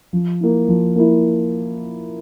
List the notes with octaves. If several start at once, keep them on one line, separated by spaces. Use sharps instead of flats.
F3
A#3 E4
F3
A#3 E4